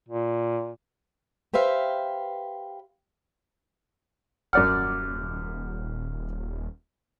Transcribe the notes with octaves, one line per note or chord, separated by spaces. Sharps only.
A#2
G4 B4 C5 E5 F5 G5
D#1 F#2 D5 F#5 F6